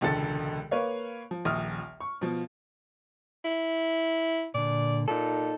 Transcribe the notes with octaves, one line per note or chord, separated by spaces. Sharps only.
E1 C#2 D3 A4 A6 C#7
A#3 B4 C#5 F5
F3
D#1 A#1 D#6 F6
C#6
B2 F3
E4
A#2 D3 D5
A#2 D#4 A4